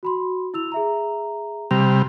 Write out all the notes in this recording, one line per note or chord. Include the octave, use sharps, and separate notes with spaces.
F#4 B5 C6
E4 E6 F7
G#4 E5 A#5
C3 G3 A#6 F7